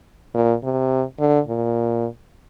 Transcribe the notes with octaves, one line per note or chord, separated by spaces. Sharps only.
A#2
C3
D3
A#2